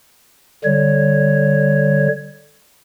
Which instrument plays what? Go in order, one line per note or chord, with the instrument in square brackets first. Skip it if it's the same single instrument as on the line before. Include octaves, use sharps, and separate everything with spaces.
[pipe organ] D3 G3 C#5